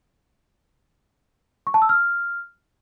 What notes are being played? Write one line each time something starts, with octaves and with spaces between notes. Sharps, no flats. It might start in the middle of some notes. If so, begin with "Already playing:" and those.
C#6
A5
E6
F6